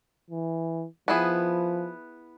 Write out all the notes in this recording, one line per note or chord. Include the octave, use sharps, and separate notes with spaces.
E3
F3 B3 E4 G#4